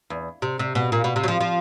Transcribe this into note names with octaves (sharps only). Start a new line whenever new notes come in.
E2
C3
C3
B2
A#2
B2
C3
F#3
F3
F3